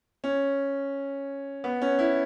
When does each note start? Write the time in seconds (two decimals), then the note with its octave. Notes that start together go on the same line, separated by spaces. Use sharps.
0.24 C#4
1.64 B3
1.82 C#4
1.99 E4